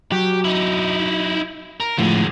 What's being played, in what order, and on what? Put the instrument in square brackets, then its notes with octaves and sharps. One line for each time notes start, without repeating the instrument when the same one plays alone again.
[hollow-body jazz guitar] F#3 [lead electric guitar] G4
[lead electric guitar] D#4 E4
A#4
[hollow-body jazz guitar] A2 F3 [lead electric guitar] D3 G#3